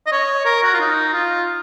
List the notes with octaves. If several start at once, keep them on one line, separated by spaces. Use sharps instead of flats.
D#5
C#5
A#4
F#4
F4
D#4
F4